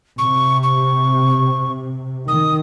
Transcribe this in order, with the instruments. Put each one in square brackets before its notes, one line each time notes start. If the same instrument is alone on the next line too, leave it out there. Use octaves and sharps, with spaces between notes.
[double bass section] C3 [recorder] C#6
[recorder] C#6
[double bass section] D#3 [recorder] D#6